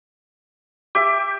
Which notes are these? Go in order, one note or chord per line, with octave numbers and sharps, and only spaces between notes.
G4 E5 D6